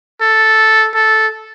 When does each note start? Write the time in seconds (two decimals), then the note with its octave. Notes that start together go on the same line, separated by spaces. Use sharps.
0.21 A4
0.94 A4